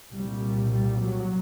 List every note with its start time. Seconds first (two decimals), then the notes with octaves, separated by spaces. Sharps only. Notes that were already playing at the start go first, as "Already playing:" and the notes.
0.13 C2 A#2 G3
0.70 G3
0.99 F#3